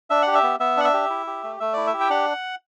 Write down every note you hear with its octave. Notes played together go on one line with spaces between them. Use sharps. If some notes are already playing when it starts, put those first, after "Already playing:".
D4 E5
G4 F#5
E5
B3
B3 E5
D4 F#5
E5
G4
E4
G4
A3
A3 E5
E4 D5
E5
G4
G5
D4 F#5